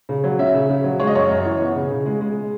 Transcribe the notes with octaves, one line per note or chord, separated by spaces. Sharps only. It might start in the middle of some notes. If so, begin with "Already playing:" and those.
C#3
F#3
C#4 E5
C#3
C#3
F#3
G#3 C#5
D#5
F#2 C#5
F#2
E3
B3
C#3
C#3
G#3
G#3